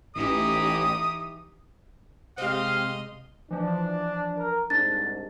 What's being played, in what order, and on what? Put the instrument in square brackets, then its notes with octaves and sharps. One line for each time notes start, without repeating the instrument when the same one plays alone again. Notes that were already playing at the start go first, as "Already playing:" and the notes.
[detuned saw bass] A1 [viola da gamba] E3 D#4 G4 [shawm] D#6
[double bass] C3 G#3 [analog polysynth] C4 G4 [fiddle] D#5 C6 [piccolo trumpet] F5
[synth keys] E3 F3 [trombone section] D4
[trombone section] A#4
[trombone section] C2 G#2 [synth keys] D4 [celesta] A6